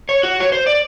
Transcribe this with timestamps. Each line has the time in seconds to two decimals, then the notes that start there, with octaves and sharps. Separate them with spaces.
0.09 C#5
0.23 F#4
0.40 C#5
0.52 C5
0.67 D5